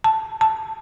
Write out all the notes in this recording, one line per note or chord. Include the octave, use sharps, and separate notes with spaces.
A5
A5